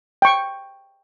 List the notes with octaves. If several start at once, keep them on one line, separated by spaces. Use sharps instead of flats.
G5 C#6